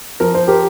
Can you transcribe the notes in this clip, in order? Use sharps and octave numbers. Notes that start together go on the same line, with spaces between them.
F3 A#4
C5
G4 A#4